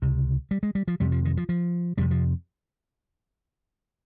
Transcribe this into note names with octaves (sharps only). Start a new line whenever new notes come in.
C#2 C3
G3
G#3
G3
F3
F2 C3 G3
F3
D#3
F3
F3
F2 C3 G3
F3